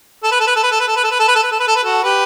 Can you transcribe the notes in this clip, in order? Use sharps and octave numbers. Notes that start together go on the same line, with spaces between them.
A4
B4
A4
B4
A4
B4
A4
B4
A4
B4
A4
B4
A4
B4
A4
B4
A4
B4
A4
B4
F#4 A4
G4 B4